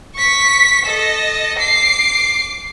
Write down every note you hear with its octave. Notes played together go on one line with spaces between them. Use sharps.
C#6 B6
A4 D#5
D6 C7